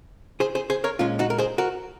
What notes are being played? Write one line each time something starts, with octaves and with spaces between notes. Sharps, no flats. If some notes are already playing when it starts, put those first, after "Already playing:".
G#4 C5
G#4 C5
G#4 C5
A#4 C#5
A#2 G#3 C#4 F4
D#4 F#4
A#4
G#4 C5
F#4 A#4